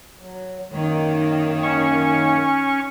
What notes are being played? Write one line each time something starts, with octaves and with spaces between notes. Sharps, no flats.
F#3
F#2 D#3 A#3 C#5
C#4 C#6